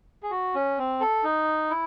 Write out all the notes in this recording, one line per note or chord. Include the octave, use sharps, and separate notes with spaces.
G#4
F#4
C#4
C4
A4
D#4
E4